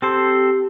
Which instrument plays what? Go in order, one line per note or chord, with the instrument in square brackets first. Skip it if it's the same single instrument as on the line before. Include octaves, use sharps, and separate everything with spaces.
[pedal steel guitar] C4 A4 C5 [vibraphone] G4